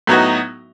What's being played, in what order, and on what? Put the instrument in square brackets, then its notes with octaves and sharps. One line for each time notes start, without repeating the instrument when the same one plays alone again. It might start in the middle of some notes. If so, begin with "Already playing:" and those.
[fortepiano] A2 F#3 B3 D#4 F#4